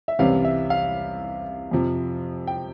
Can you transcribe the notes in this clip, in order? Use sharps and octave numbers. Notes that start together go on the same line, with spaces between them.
E5
C2 C3 E3 G3 C#4 F5
E5
F5
F2 C3 F3
G5